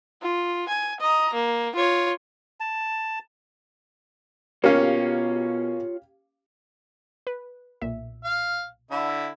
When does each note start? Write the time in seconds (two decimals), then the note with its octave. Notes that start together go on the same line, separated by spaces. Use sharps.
0.22 F4
0.69 G#5
1.01 D#5 A#5
1.34 A#3
1.75 F4 C#5
2.60 A5
4.64 B2 A#3 C#4 F4 G4 C#5 F5
7.27 B4
7.82 B1 A#2 E5
8.24 F5
8.91 D3 E4